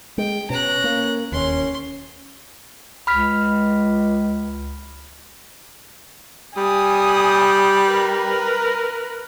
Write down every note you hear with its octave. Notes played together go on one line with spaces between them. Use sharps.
G#3 G5
B2 C#4 A#5 F#6
A#3
E1 D#2 C#4 C6
C#2 B5 F6 B6
G3 G#5 D#6
A#4 B4